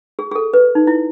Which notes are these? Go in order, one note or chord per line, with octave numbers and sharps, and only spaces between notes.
G#4
G#4
A4
B4
D#4
E4